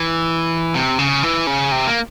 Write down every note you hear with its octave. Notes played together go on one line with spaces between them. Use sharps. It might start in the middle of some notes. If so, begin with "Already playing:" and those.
Already playing: E3
C3
C#3
E3
C#3
C3
A#3